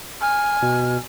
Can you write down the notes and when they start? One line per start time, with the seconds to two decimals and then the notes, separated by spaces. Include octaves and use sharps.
0.21 G#5 F6
0.62 B2